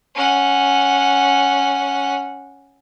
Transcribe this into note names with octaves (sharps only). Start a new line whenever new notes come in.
C#4 F#5